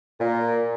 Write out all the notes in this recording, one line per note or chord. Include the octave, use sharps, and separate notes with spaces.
A#2